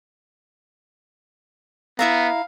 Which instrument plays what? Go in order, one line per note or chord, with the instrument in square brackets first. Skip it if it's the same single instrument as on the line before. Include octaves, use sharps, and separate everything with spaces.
[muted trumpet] B3 [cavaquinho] E4 E5 A#5 [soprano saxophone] F5